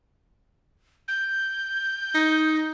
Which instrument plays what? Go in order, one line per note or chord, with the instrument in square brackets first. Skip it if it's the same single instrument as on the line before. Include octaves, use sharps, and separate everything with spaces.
[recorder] G6
[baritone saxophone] D#4